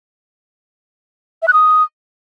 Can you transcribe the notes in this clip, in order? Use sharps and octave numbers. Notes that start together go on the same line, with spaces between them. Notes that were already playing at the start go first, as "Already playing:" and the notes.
E5
F#6
D#6